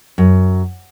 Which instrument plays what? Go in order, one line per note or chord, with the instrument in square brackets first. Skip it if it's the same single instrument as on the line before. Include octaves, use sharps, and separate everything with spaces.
[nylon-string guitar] F#2